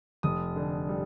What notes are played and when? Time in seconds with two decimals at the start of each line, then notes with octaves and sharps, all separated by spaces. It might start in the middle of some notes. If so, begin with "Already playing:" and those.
0.23 F1 D#6
0.56 D3
0.89 G3